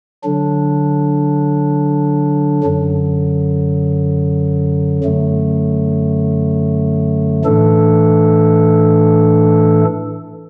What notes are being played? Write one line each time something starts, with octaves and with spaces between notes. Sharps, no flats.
D3 F#3 D4
F#2 D3 F#3
F#2 D3 F#3 A3
A2 E3 A3 D4 A4